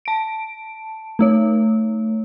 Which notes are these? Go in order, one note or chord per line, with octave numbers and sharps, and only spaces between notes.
A5 D7
A3 D#4 C#5